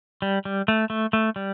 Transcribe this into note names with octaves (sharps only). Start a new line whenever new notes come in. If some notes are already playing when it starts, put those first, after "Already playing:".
G3
G3
A3
A3
A3
G3